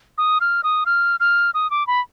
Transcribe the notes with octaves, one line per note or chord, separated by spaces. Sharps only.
D#6
F6
D#6
F6
F6
D#6
D6
B5